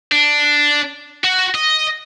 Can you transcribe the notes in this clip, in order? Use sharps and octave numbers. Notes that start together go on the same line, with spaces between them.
D4
F#4
D#5